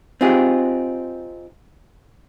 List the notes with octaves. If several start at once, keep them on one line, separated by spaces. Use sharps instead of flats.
C4 D#4 F4 G4 G#4